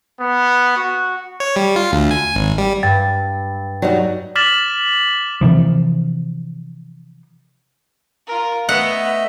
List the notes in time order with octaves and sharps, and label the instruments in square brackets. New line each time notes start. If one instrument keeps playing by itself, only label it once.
[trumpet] B3
F#4
[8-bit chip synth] C#5
G3
F4
D2
G#5
G#1
G3
[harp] G2 [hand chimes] G5 A6
[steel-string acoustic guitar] F#3 G3 D#4
[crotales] D6 F6 A6 B6 E7 F#7
[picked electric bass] C3 E3 F3
[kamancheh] F4 A#4
[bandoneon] A3 D#5 E5 [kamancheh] B3 [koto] F#5